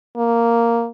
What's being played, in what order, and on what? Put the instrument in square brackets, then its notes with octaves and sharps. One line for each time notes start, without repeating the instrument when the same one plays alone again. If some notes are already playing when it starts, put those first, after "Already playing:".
[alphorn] A#3